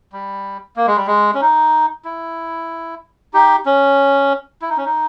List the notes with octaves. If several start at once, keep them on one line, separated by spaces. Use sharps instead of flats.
G3
A#3
G#3
G3
G#3
C#4
D#4
E4
D#4 G4
C#4
E4
D#4
C#4
D#4